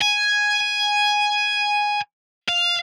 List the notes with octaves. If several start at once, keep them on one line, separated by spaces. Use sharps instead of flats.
G#5
F5